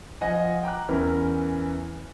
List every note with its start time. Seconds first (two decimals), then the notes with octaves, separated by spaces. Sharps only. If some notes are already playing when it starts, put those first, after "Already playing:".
0.21 F3 D#5 F#5 G#5
0.63 G5 A#5 D6 F#6
0.89 E2 E3 C#4 E4 A#4